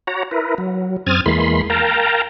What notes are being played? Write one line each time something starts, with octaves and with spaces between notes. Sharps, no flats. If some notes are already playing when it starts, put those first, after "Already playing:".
F#4 C#5 A#5
E4 A#4 B4
F#3
F#2 C4 D#6 F6 G#6 A6
E2 E3 G#3 A#3 B5 C6
A#4 F5 G5 A5 A#5